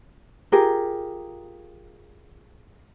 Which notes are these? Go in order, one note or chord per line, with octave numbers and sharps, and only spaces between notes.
F4 G4 G#4 A#4